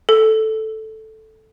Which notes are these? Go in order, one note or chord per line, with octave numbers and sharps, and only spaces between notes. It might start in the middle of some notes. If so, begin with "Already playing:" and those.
A4